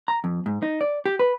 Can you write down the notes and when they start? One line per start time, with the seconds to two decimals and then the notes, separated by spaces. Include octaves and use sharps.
0.08 A#5
0.24 F2
0.46 G#2
0.62 D#4
0.81 D5
1.06 G4
1.19 B4